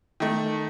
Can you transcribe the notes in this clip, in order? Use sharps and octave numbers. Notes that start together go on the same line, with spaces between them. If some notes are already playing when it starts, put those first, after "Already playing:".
D#3 A3